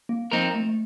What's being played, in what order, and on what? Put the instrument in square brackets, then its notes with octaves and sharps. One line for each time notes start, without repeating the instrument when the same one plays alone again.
[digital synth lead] A#3
[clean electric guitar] F3 C4 D#4 A#4 [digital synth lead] A#3
[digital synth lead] A3
A3